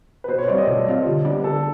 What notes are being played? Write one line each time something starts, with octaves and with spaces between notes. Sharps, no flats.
B4
B2 C5
C#5
G3 C4 F4 D5
D#5
B2 A4
G3 C4 F4
D3
G3 B3 D4 G4
D3 A4